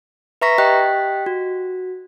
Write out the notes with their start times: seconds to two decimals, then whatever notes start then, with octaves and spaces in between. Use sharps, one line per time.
0.41 B4 E5 A#5 C#6 A#6 B6
0.58 G4 D#5 G5 F#6 B6
1.26 F#4